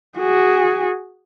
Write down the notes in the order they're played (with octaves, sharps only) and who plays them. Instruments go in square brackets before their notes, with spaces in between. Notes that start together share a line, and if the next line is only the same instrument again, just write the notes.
[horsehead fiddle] F#4 G#4